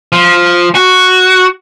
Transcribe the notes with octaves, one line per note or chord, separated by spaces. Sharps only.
F3
F#4